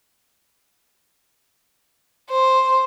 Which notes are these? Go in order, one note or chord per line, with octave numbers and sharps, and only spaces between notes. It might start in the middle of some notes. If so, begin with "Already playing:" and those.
C5